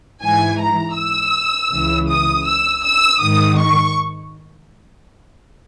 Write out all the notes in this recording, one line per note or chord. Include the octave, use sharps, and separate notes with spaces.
G#2 E3 G#5
A#5
E6
C#2 C#3 E3
D#6
E6
E6
G#2 D#3 D#6
C#6